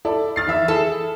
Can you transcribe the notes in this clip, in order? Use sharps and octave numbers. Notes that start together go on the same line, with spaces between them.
E4 A4 D5
F6 A6 C7
E3 E5 E6
E4 G#4 A4